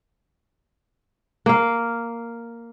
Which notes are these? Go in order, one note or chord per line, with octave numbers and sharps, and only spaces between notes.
A#3 F5